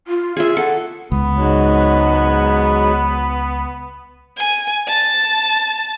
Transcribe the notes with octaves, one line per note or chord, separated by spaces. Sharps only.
F4
F4 G#4 E5
A4 F#5
C#2 B3
G#2 F#3
G#5
A5